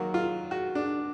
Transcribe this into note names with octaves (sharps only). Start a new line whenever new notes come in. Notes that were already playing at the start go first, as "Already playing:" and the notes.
Already playing: D#3 F#3 A#3 F#4
F4
F#4
D4